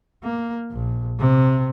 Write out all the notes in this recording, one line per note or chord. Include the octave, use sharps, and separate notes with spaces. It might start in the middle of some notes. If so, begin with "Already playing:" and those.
A#3
A#1
C3